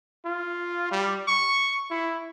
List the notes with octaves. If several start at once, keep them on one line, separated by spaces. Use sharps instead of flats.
F4
G3
C#6
E4